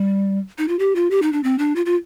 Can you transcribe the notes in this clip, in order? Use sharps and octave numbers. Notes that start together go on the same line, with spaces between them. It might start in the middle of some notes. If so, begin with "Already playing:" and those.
Already playing: G3
D#4
F4
G4
F4
G4
D#4
D4
C4
D4
F4
F4